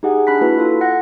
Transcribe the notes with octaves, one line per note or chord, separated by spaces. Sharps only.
D#4 G4 G#4 F#5 G#5
D4 B5 F#6 B6
A#3 E4 F#4 B4 B6
F4 A4
F#5 F#6 A#6